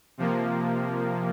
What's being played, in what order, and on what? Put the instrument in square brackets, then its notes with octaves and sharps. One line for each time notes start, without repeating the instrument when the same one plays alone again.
[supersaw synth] C3 F3 A#3